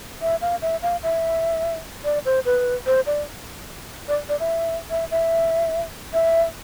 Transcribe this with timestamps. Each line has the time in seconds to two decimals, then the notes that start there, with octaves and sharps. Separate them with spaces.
0.22 E5
0.41 F5
0.62 E5
0.83 F5
1.03 E5
2.04 D5
2.26 C5
2.45 B4
2.86 C5
3.06 D5
4.08 D5
4.29 D5
4.40 E5
4.90 E5
5.11 E5
6.13 E5